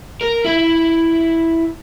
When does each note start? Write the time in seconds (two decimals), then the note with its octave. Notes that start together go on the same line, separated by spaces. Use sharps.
0.21 A#4
0.45 E4 E5